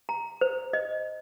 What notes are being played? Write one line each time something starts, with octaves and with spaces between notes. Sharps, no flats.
A#5
C5
D#5